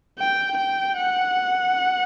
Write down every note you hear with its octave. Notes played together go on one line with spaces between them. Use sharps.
G5
G5
F#5